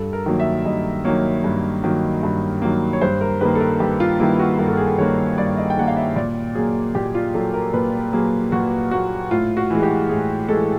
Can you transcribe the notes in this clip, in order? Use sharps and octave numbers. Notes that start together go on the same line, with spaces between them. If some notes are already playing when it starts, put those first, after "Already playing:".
Already playing: G2 A4
A#4
D#3 F#3 A#3
E5
G2 D#5
D#3 F#3 A#3 C#5
G2
D#3 F#3 A#3
G2
D#3 F#3 A#3
C#5
G2 C5
A#4
D#3 G3 A#3 B4
A4
A#4
G2 G4
F4
D#3 G3 A#3 E4
F#4
G2 A#4
A4
G#4
A4
D#3 G3 A#3 C#5
G2 D5
D#5
G5
D#3 G3 A#3 F#5
F5
E5
A#2 D5
F#3 A#3 G#4
A#2 G4
F4
F#3 A#3 A4
A#4
A#2 B4
F#3 A#3 G#4
A#2 F#4
F#3 A#3 F#4
A2 F4
F#4
E3 G#3
G4
A2 G#4
E3 G#3 A4